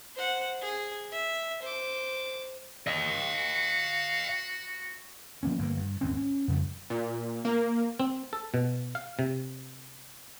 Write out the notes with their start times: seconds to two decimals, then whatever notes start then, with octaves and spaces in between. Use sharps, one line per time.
0.16 C5 F#5
0.61 G#4
1.12 E5
1.62 C5 D6
2.87 F#4 D#5 F5
5.43 F3 A#3 B3 C#4
5.59 G1 C#3 A#3
5.77 G2
6.01 G#1 D#2 C4 C#4
6.17 C#4
6.48 F2 C#3 G3
6.90 A#2
7.45 A#3
8.00 C4
8.33 A4
8.54 B2
8.95 F5
9.19 C3